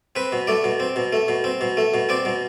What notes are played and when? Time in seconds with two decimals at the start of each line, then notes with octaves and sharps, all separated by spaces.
0.16 C4 B4
0.32 B2
0.47 A3 D5
0.64 B2
0.80 C4
0.96 B2
1.13 A3
1.28 B2
1.44 C4
1.61 B2
1.77 A3
1.94 B2
2.09 C4 D5
2.25 B2